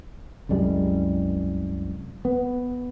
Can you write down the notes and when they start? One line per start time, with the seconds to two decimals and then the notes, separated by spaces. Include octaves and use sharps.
0.49 C2 F#2 G3 G#3
2.25 B3